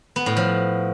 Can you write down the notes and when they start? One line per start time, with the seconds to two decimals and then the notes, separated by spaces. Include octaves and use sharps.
0.16 B3
0.26 A2
0.37 F3